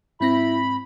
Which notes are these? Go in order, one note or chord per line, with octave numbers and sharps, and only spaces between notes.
G#2 C4 E4 B5 A#6